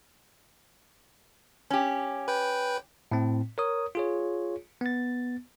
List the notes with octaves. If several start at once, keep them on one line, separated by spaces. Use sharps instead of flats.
C#4 G4
B4 G5
A2 C4
A#4 C#5 D#6
F4 G#4 C#5
B3 A6